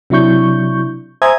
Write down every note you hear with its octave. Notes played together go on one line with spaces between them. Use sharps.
C3 F#3 D4 E4 C#6 G6
C5 E5 G#5 A#5 D#6 G#6